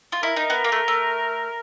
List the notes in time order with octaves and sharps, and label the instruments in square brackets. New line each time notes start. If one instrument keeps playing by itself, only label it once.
[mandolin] F4
[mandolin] E4 [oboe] A#4
[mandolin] D#4
B3
A#3
A3
A3